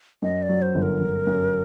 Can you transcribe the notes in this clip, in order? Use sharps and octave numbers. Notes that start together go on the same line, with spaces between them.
F#2 D#5
D5
F#3
C5
G1
A#4
G1
F#2